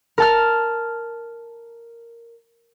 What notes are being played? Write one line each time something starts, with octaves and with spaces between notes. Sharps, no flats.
A#4 A5 F6